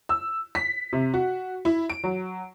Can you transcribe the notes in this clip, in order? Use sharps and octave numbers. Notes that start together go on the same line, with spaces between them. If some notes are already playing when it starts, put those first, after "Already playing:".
E6
B6
C3
F#4
E4
D7
F#3